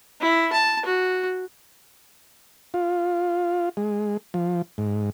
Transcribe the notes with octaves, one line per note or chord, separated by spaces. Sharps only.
E4
A5
F#4
F4
G#3
F3
G#2